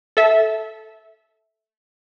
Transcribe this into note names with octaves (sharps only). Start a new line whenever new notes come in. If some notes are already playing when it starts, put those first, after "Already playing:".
A4 E5